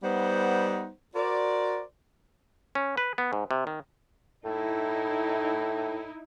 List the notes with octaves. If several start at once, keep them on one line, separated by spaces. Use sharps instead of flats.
G3 B3 D#4 C5 F#5
F#4 A#4 C5 D5
C#4
B4
B3
G#2
C3
D#3
A2 D#4 E4